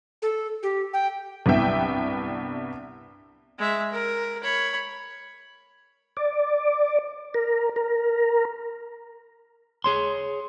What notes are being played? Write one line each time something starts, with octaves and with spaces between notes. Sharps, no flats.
A4
G4
G5
C2 G2 B3 E4 E5 G5
G#3 E5
A#4
C#5 B5
D5
A#4
A#4
G#4 C#5 C6